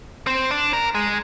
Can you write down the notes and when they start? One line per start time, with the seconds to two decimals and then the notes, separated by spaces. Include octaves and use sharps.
0.27 C4
0.51 D4
0.73 A#4
0.95 G#3